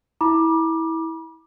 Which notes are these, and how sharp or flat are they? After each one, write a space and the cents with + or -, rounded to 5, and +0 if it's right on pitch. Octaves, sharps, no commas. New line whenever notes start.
E4 -20 B5 -40 D6 +15